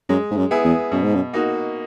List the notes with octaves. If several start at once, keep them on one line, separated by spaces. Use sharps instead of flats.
F#2 G#3
G#2
F#2
B3 E4 G#4
E2
F#2 B2
G#2
F#2
A#3 D#4 F#4